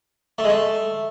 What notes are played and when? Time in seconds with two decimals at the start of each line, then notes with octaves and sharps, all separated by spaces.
0.38 A3
0.44 G#3
0.49 A3